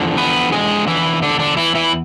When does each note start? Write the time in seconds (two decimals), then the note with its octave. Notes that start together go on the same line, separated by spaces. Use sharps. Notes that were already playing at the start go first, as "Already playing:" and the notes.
Already playing: E2 D3 F3
0.17 B3 B4
0.52 G#3 G#4
0.88 E3 E4
1.22 D3 D4
1.40 D3 D4
1.57 E3 E4
1.75 E3 E4